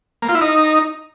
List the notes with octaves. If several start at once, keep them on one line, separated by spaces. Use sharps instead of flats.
A#3
F4
E4
D#4